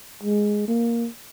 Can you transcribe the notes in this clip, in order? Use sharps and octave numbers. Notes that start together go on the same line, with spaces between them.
G#3
A#3